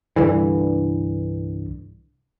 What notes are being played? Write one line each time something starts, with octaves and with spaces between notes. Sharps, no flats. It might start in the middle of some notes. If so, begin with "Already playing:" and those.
C2 G2 D3 E3